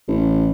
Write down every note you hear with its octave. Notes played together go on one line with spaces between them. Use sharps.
A1